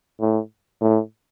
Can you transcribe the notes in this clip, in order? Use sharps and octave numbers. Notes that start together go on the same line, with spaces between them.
A2
A2